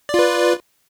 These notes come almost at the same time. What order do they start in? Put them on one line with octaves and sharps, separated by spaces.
D5 F4 B4